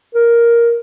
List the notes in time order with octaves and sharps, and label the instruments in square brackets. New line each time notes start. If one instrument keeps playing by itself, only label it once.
[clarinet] A#4